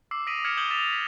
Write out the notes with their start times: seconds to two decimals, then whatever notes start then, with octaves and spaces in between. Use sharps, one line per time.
0.11 D6 E6 C7
0.27 D#6 A#6 B6 D7 D#7 F#7
0.44 F6 G#6 B6 C#7 E7 F#7
0.57 D#6 G6 F#7 G7
0.70 E6 A6 B6 E7 F7
0.93 B6 E7